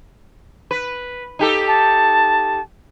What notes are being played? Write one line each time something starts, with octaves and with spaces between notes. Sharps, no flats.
B4
D#4 G4 A4
A5